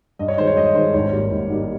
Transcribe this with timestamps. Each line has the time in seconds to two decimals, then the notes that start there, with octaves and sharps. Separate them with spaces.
0.19 G2 D#5
0.28 C#5
0.37 D#3 G#3 C5
0.47 C#5
0.57 G2 D#5
0.75 D#3 G#3 C5
0.94 G#1 C#5
1.12 G#2 G3 A#3
1.31 G#1
1.50 G#2 G3 A#3